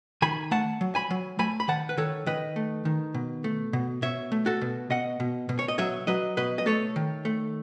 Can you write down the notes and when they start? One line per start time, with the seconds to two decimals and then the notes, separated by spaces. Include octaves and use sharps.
0.22 D#3 G#5 B5
0.51 A3 F#5 A5
0.81 F#3
0.95 G#5 B5
1.10 F#3
1.39 A3 G#5 B5
1.60 B5
1.68 D#3 F#5 A5
1.89 B4
1.97 D#3 A4 C#5
2.26 D#3 B4 D#5
2.56 A3
2.85 D#3
3.14 B2
3.44 A3
3.73 B2
4.02 B2 C#5 E5
4.32 A3
4.46 F#4 A4
4.61 B2
4.90 B2 D#5 F#5
5.20 B2
5.49 B2
5.59 C#5
5.68 D#5
5.78 F#3 C#5 E5
6.07 F#3 B4 D#5
6.37 B2 B4 D#5
6.58 D#5
6.66 A3 A4 C#5
6.96 D#3
7.25 A3